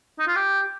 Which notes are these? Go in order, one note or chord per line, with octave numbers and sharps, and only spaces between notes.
D#4
F4
G4